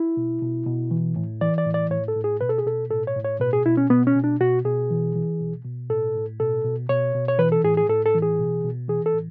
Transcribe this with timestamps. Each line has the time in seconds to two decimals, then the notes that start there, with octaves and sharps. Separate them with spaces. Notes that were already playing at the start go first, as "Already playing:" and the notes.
Already playing: E4
0.17 B2
0.42 B2
0.66 B2
0.91 E3
1.16 A2
1.41 E3 D5
1.58 D5
1.66 A2
1.74 D5
1.91 A2 C#5
2.08 A4
2.15 A2
2.24 G#4
2.41 B2 B4
2.49 A4
2.58 G#4
2.66 B2 A4
2.91 A2 A4
3.07 C#5
3.16 A2
3.25 C#5
3.40 B2 B4
3.53 G#4
3.66 B2 E4
3.77 C#4
3.90 B2 B3
4.07 C#4
4.15 B2
4.24 D4
4.40 B2 F#4
4.65 B2 G#4
4.91 E3
5.15 E3
5.40 B2
5.65 B2
5.90 A2 A4
6.15 A2
6.40 B2 A4
6.65 B2
6.89 B2 C#5
7.15 B2
7.28 C#5
7.39 E3 B4
7.52 A4
7.64 A2 G#4
7.77 G#4
7.89 A2 A4
8.06 A4
8.14 E3
8.22 G#4
8.39 B2
8.64 B2
8.88 E3 G#4
9.06 A4
9.14 A2